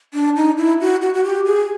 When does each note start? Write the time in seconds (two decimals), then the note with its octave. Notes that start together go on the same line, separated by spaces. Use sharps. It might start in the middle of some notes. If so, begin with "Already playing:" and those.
0.14 D4
0.36 D#4
0.57 E4
0.81 F#4
1.02 F#4
1.14 F#4
1.24 G4
1.46 G#4